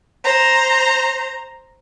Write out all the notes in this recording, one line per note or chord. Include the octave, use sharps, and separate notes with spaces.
C5 A#5